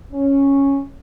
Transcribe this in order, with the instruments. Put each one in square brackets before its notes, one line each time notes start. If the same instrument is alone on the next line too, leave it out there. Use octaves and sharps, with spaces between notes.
[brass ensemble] C#4